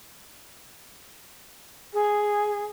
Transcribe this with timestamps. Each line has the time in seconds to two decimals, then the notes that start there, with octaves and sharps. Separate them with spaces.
1.93 G#4